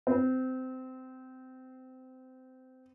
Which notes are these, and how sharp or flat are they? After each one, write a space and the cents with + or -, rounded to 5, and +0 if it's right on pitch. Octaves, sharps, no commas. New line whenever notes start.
C4 -20